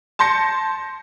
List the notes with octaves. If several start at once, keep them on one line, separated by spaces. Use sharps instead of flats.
A5 C6 G6 A#6 C#7